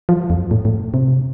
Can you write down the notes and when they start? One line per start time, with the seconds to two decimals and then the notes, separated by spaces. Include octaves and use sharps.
0.09 F3
0.30 F2
0.51 A2
0.65 A2
0.94 C3